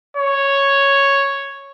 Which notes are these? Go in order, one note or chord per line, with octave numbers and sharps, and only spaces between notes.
C#5